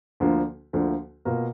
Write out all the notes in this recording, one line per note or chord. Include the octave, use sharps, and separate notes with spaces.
D2 D3 F3 A#3
D2 D3 F3 A#3
B2 A#3 F4 A#4